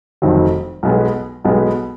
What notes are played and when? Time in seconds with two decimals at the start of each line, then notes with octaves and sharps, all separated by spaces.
0.22 F1 F2 D#3 F#3
0.83 B1 B2 G#3 B3
1.44 B1 B2 G#3 B3